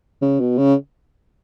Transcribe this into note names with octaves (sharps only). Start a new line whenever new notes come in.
C#3
B2
C#3